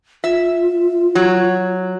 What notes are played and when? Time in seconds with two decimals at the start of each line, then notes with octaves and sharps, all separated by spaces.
0.24 F4 E5
1.15 F#3